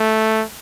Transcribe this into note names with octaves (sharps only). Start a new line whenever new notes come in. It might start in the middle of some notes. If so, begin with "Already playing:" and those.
Already playing: A3